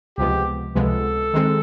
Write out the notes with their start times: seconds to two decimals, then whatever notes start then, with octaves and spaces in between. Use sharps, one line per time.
0.17 C#2 C3 F3 G#3 B3 G4
0.75 C#2 C3 F3 G#3 B3 A4
1.33 D#3 G#3 C4